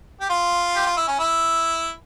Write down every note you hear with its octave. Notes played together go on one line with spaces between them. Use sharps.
G4
F4
G4
F4
E4
C#4
E4